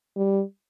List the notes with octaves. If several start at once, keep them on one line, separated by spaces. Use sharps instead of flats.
G3